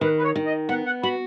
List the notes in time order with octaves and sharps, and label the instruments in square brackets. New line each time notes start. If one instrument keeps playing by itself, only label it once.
[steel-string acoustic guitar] D#3 [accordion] B4
[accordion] B4
C#5
[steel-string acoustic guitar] D#3
[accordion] D#5
[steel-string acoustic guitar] B3 [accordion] F#5
[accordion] F#5
[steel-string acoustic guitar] F#4 [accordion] B5